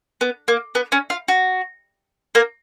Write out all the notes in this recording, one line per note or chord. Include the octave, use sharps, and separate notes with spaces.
B3
A#3
B3
C#4
F4
F#4
A#3 A#4